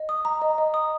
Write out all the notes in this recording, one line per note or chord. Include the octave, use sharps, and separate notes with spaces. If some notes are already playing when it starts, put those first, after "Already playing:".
Already playing: D#5
D#6
A#5
D#5
D#5
D#6